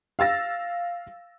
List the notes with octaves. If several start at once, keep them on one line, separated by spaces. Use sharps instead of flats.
F5 E6 A6 A#6